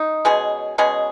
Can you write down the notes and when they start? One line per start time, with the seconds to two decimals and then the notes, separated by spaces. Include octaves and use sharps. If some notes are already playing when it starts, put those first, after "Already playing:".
Already playing: D#4
0.25 B2 G#3 C#4 G#4
0.78 B2 G#3 C#4 G#4